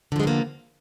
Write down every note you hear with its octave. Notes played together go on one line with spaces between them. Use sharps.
D3 F3 G#3 A#3 B3